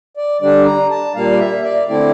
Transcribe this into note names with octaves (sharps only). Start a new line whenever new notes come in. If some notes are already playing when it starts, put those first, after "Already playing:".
D5
D3 G3 D4 D5
A#5
A5
A#2 G3 A#3 F5
D5
E5
D5
D3 A3 C4 E4 D5